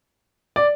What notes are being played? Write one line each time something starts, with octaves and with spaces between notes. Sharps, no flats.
D5